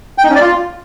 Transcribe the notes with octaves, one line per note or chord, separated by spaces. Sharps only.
G5
D#4
C#4
D5
F4